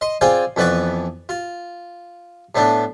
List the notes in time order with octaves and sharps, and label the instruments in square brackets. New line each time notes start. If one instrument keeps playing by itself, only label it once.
[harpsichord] D#5 C6
C4 F4 G#4 D5 G5 G#5
F2 E3 B3 B4 D5 C#6
F4
A2 A3 B3 D4